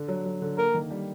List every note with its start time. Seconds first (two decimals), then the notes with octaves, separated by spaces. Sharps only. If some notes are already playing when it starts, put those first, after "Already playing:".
Already playing: D3
0.08 F#3
0.25 F#3
0.42 D3
0.58 A#3 A#4
0.74 D#3
0.91 G3